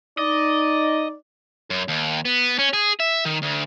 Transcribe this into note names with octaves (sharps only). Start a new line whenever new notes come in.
D#4 D5 D#5
F#2
D#2
B3
C#4
G#4
E5
D#3
D2